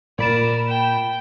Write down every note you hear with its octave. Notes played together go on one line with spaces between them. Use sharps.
A#2 A#4 D5 B5 E7
G5